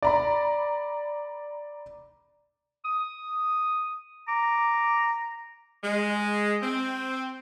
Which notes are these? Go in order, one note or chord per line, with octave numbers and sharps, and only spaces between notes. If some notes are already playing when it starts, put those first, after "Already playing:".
D5 A#5 B5
D#6
A#5 D6
G#3
C4